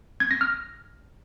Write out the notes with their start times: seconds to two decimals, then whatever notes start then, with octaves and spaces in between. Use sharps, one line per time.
0.20 G#6
0.31 A#6
0.41 F6